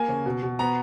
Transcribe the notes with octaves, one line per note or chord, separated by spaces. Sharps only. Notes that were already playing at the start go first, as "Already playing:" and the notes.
Already playing: A#3 G#5
C#3
B2
B2
B3 A#5